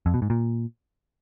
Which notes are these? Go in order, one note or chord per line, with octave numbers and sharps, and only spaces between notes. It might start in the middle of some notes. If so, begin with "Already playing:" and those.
F2
B2
G#2
A#2